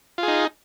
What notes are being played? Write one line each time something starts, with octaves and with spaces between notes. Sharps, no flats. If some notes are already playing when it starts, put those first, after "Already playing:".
D#4 F4 G#4